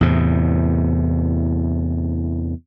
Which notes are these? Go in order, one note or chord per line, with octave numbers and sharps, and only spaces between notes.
E2 A2 C3